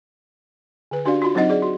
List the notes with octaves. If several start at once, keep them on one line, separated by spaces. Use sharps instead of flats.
D3 B4
C#4 D4 F#4 G4 D5 F5
F4 F#4
F#3 C4 D#4 D#5 F#5
G#4 D5
F#4